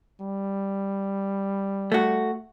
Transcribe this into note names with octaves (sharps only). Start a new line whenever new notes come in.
G3
A3 F#4